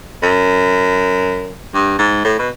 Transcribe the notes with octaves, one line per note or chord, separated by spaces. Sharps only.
F#2
G2
G#2
A2
B2